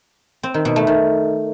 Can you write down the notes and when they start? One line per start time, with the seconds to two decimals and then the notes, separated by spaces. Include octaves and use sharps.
0.43 C4
0.54 D#3
0.65 B2
0.76 A3
0.87 D#3